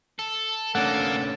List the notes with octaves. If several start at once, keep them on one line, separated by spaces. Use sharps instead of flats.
A4
A3 A#3 C#4 D4 A4 F#5